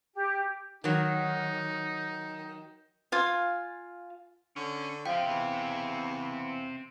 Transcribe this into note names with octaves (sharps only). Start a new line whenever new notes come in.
G4
D#3 F#3 D#4
F4 F5 G#5
D3 C#4
F3 C4 E5 F5 G5
E2